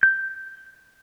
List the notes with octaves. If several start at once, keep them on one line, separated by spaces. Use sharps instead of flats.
G6